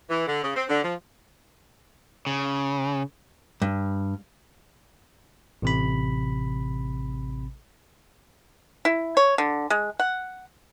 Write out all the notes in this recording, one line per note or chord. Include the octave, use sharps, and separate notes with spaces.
E3
D3
C#3
C4
D3
F3
C#3
G2
A1 C3 B5
E4
C#5
D3
G#3
F#5